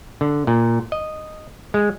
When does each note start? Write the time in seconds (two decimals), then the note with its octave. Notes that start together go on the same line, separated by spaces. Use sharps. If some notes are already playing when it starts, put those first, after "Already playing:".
0.21 D3
0.47 A#2
0.92 D#5
1.74 G#3